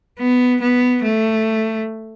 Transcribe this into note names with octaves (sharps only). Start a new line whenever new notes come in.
B3
B3
A3